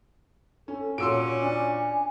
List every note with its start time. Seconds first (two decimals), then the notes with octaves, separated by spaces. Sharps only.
0.68 C#4 A4
0.98 A#2 C#4 F#4 C#5 C6 E6 D7
1.42 D4 G#5